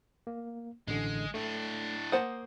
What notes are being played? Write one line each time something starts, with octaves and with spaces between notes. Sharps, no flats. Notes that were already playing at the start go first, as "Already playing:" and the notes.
A#3
A1 D3 G#3
A2 A3 D4
A#3 C5 F#5 D#6 G6